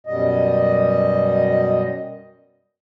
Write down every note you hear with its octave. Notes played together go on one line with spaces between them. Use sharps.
F#2 B2 G3 D#5